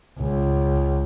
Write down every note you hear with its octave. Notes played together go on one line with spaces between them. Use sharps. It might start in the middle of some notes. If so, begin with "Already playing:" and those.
C#2